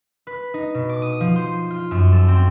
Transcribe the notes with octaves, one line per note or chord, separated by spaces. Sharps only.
B4
D#4
B2
D6
D#6
F3
C5
F4
F#2
A4
C4